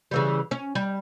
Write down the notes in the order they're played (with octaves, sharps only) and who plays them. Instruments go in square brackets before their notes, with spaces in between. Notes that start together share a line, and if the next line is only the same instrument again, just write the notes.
[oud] C#3 E3 G3
C#4
G3